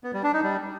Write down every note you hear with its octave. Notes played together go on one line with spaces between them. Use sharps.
B3
G3
D4
D#4
G3